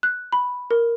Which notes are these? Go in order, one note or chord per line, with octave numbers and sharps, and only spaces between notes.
F#6
B5
A#4